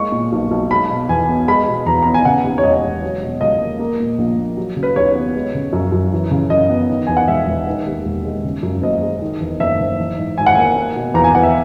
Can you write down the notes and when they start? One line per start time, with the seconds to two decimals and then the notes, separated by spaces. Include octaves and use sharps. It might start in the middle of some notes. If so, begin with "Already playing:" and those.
Already playing: G#3 A#3 C#6
0.12 A#2
0.32 B1
0.51 B1
0.71 G#3 B5
0.90 B2
1.09 E2 G#5
1.29 B3
1.48 G#3 B5
1.68 B2
1.86 E2 A#5
2.02 B3 A#5
2.14 G#5
2.25 C#3 F#5
2.44 D#2
2.58 C#5
2.63 E1 D#5
2.84 E1
3.02 F#3
3.22 B2
3.41 C#2 D#5
3.61 A#3
3.79 A#3
4.00 A#2
4.18 A#1
4.38 A#1
4.57 F#3
4.76 C#3
4.83 B4
4.96 D#2 C#5
5.15 B3
5.35 G#3
5.54 C#3
5.73 F#2
5.92 F#2
6.12 E3
6.31 C#3
6.50 F#2 D#5
6.70 B3
6.89 D#3
7.07 E2 G#5
7.17 F#5
7.28 E1 E5
7.47 E1
7.67 D#3
7.86 D#2
8.05 E1
8.25 G#3
8.44 C#3
8.63 F#2
8.82 F#1 D#5
9.02 G#3
9.22 D#3
9.40 E2
9.60 F#1 E5
9.80 F#1
9.98 E3
10.18 G#2
10.38 G#1 G#5
10.46 F#5
10.55 A#3 G#5
10.76 A#3
10.96 B2
11.14 E2 A#5
11.24 G#5
11.34 E2 F#5
11.43 E5